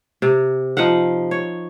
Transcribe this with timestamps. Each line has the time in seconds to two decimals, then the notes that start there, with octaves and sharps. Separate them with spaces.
0.22 C3
0.77 F3 D#4 F5 F#5
1.31 C#5